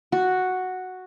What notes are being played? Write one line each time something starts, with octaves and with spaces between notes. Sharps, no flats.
F#4